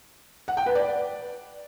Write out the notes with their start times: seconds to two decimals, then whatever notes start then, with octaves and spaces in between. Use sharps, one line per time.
0.48 F#5
0.57 G5
0.66 B4
0.75 D5